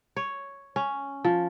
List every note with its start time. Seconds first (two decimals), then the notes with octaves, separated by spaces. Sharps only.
0.16 C#5
0.76 C#4
1.24 F3